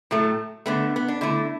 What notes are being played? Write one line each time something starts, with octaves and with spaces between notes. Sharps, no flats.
A2 F#3 A3
D3 A3 B3
B3
D4
D3 A3 E4